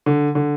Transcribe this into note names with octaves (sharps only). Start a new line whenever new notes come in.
D3
D3